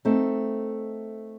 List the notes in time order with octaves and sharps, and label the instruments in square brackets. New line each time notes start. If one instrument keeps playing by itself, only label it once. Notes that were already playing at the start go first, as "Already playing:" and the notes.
[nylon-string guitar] A3 C4 D#4